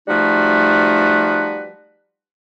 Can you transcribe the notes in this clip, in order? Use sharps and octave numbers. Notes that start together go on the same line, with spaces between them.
F3 G3 A3 D#4 F#4 B4